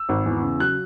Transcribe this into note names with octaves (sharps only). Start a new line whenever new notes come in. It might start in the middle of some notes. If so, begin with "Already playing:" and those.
Already playing: E6
G#1
E2
C#3
F#3 F#6